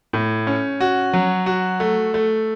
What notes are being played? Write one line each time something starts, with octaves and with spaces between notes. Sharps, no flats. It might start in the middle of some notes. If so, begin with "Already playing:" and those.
A2
C#4
F#4
F#3
F#4
A3
A3